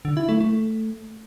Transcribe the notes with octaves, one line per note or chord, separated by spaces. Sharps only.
D3
E4
A3
A3